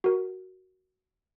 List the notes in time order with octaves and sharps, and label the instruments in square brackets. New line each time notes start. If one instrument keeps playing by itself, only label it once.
[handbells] F#4 A#4